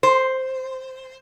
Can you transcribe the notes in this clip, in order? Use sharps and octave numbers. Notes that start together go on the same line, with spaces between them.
C5